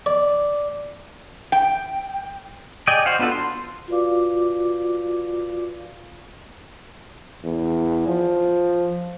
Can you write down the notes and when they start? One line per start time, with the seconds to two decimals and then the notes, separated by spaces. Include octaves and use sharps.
0.06 D5
1.52 G5
2.87 G#4 D5 D#5 G5
3.06 F#4 C5 F5 F#5
3.19 B3 D4 F4 F#4 A4
3.32 C6
3.88 F4 F#4 B4 D5 F5 D6
7.44 E2
8.08 F3